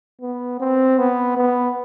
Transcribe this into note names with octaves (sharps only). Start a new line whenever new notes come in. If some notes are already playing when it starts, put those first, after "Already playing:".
B3
C4
B3
B3